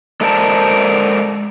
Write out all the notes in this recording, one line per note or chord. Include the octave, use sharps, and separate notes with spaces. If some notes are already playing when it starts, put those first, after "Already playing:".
G#3 A4 A#4 C5 D5 A5